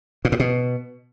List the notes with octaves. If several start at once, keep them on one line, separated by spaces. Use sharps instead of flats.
A#2
A2
B2